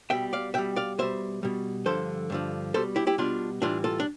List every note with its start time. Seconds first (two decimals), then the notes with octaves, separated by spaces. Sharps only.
0.10 B2 G3 E5 G5
0.33 D5 F5
0.54 B2 G3 E5 G5
0.76 D5 F5
0.98 B2 G3 C5 E5
1.43 B2 G3
1.86 G2 D3 F3 A4 C5
2.30 G2 D3 F3
2.74 B2 G3 A4 C5
2.96 E4 G4
3.07 E4 G4
3.18 B2 G3 D4 F4
3.62 A2 E3 G3 D4 F4
3.84 F4 A4
4.00 D4